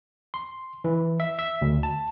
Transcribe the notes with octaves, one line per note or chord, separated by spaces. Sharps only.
C6
E3
E5
E5
D2
A5